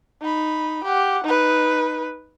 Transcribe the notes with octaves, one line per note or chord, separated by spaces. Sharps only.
D#4 B5
G4 F#5
D#4 B4